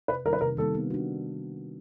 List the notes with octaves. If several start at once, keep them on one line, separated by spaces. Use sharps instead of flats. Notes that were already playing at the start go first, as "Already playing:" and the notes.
C3 B4
D#3 G3 A#3 A#4
B4
C3 A#4
D#3 G3 A#3 A4
B3
D4 F#4